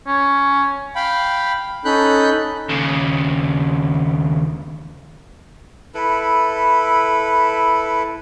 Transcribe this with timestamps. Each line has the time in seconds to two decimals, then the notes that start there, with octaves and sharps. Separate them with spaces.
0.07 C#4
0.95 F5 G5 B5
1.85 C#4 D#4 A4 B5 F#6 G6
2.69 D#2 C#3
5.95 E4 A4 B4